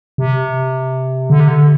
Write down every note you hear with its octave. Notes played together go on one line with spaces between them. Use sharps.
C3
D3
C3
D3